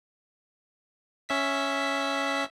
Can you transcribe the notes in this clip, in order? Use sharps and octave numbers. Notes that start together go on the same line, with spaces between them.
C#4 E5 B6